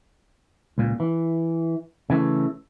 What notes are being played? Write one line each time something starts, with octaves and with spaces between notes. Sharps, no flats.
C#2 A#2
E3
C#3 E3 G#3 A3